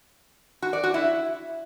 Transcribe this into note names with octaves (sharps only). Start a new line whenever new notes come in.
F#4
D5
F#4
E4